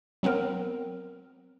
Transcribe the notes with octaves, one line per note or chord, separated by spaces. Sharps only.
F#3 B3 C4 A#4